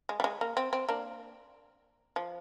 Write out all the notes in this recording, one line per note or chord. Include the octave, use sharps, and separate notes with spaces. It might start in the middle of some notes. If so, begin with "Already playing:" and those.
G#3
G3
G#3
A#3
C4
C4
A#3 D4
F3